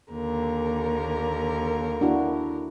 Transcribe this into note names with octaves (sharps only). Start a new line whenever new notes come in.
D#2 D3 A#3 A#4
D4 E4 F#4